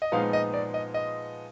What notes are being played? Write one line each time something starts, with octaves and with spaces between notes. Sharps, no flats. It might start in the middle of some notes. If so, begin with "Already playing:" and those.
D#5
A#2 F3 G#3 B3 D#4 F5
D#5
D5
D#5
D#5